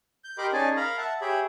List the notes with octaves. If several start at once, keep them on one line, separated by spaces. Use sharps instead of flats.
G6
G4 A#4 D#5 B5 C6 D6
C#4 D#4 G#4 D5 G#5 A5
A#4 F5 A#5 B5
E5 F#5 A5
G4 G#4 C#5 E5 B5